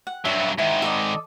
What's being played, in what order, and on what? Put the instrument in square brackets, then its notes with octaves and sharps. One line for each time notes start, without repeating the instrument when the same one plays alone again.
[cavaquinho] F#5
[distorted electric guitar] G2 F#3 [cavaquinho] E5
[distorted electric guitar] G#2 D#3 [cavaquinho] E4
[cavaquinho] A4 D5 D#5